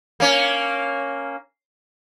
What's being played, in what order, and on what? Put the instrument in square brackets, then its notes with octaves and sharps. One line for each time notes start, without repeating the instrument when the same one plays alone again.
[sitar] A#3 C#4